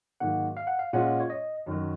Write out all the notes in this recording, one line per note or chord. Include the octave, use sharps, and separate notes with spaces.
G#2 D#3 F#3 A#3 F#5
F5
F#5
F5
A#2 G#3 C#4 F4 F#5
C#5
D#5
F#2 D#3 F#3